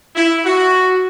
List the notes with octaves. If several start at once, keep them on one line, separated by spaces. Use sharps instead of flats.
E4
F#4